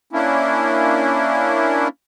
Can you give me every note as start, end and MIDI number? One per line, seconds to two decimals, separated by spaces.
0.13 1.88 58
0.13 1.88 61
0.13 1.88 62
0.13 1.88 64